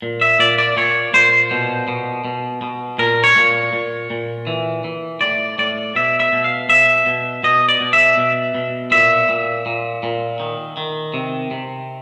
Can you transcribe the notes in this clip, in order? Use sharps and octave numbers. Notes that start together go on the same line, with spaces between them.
A#2
E5
A#2 D5
D5
A#2 C#5
A#2 C5
B2
B2
B2
B2
A#2 A#4
C#5
A#2
A#2
A#2
E3
E3
A2 D5
A2 D5
B2 E5
E5
B2
F5
B2 E5
B2
B2 D#5
D5
B2
E5
B2
B2
A#2 E5
A#2
A#2
A#2
D#3
D#3
C3
C3